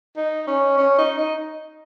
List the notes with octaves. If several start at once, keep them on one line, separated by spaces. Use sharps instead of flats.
D#4
C#4
C#4
D#4
D#4